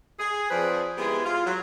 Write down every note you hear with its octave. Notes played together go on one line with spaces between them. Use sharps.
G#4
F3 C4 G#4 B4 C5 D5
G#3 B3 E4 G4 G#4
F4
F#3